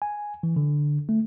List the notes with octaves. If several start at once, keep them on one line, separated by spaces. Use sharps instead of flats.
G#5
E3
D3
A3